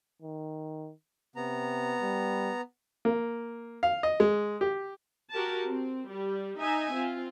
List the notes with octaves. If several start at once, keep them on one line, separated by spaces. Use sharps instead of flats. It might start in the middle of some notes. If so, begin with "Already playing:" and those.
D#3
C3 B3 A#5
G3
A#3
F5
D#5
G#3
G4
F#4 G4 A#4 A5
C4
G3
D#4 D#5 E5 G#5
C4 F4